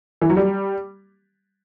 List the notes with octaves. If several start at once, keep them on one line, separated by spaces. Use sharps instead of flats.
E3
F#3
G3